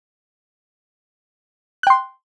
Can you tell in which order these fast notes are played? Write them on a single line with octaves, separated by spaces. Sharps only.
F#6 G5 C6